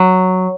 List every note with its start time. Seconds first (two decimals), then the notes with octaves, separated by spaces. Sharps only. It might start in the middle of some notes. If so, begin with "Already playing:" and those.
Already playing: F#3